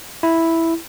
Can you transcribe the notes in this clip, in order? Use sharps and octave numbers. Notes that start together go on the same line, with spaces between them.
E4